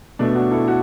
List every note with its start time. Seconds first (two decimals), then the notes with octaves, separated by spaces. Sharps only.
0.19 B2 A3 D4
0.35 D4 F#4
0.51 E4 A4
0.68 F#4